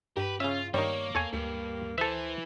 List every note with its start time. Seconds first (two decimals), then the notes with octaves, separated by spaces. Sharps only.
0.17 G2 G4 A#4 B4
0.40 C#3 C#4 F4 E5
0.74 G2 D#3 G3 A#3 C#5
1.15 E2 A4 C#5 G#5
1.33 D2 G2 A#3
1.98 E3 A4 C5 E5